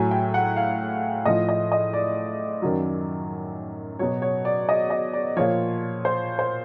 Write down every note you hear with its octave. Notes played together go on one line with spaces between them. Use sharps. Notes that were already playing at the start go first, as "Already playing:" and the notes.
Already playing: A2 F#3 G#5
G5
F#5
F5
A2 F3 D#5
D#5
D#5
D5
F#2 D#3 F#3
B2 F#3 C#5
C#5
D5
D#5
D#5
D5
A#2 F3 C#5
C5
C5